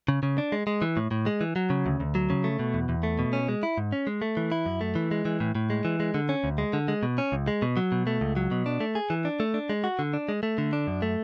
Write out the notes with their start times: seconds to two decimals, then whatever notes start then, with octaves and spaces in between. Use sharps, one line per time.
0.08 C#3
0.23 C#3
0.38 D4
0.52 G#3
0.67 G#3
0.82 E3
0.97 A2
1.11 A2
1.26 G#3
1.41 E3
1.56 F#3
1.70 C#3
1.86 D2
2.00 D2
2.15 F#3
2.30 C#3
2.44 A3
2.59 B2
2.74 E2
2.89 E2
3.03 A3
3.19 B2
3.33 C#4
3.49 G#3
3.63 E4
3.78 G#2
3.92 C#4
4.07 G#3
4.22 A3
4.37 E3
4.52 E4
4.66 F#2
4.81 A3
4.95 E3
5.11 G#3
5.25 E3
5.40 A2
5.55 A2
5.70 G#3
5.85 E3
6.00 G#3
6.14 D3
6.29 C#4
6.44 D2
6.58 G#3
6.73 D3
6.88 G#3
7.03 B2
7.18 C#4
7.32 C#2
7.48 G#3
7.62 B2
7.77 F#3
7.92 B2
8.07 A3
8.21 C#2
8.36 F#3
8.51 B2
8.66 D4
8.80 A3
8.95 G#4
9.10 E3
9.25 D4
9.40 A3
9.54 D4
9.69 G#3
9.84 F#4
9.99 D3
10.13 D4
10.29 G#3
10.43 A3
10.58 D3
10.73 D4
10.87 F#2
11.02 A3